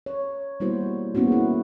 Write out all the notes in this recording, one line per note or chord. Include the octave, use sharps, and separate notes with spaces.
C#5
G3 A#3 B3 E4 F#4 C5
A#3 B3 C#4 E4 F#4
E4 G#4